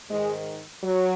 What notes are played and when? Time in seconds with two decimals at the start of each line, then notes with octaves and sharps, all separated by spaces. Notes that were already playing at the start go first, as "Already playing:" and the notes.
0.11 G#2 D#3 G#3
0.84 F#3